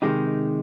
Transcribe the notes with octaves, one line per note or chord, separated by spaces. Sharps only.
C3 D#3 G#3 D#4 G4